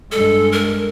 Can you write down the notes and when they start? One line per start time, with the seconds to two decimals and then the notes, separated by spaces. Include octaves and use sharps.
0.12 G2 G#3 A4
0.52 A#4